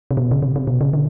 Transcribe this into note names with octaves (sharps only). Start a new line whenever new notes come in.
C3
B2
C#3
C3
C3
B2
C#3
D3